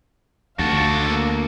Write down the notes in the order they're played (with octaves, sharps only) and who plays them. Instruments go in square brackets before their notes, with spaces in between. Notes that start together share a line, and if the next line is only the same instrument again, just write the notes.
[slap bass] D2 [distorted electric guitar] F#4 A4 [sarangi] F5
[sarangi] A#3